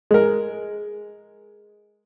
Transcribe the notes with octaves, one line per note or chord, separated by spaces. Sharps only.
G#3 A#4